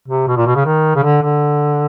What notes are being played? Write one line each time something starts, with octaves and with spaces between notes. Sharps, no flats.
C3
B2
A#2
B2
C#3
D#3
C#3
D3
D3